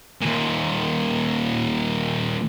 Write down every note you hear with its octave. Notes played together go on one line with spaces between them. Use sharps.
D#2 A#2